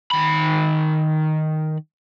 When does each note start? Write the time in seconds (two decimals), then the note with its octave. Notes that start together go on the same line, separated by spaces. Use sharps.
0.11 D#3 B5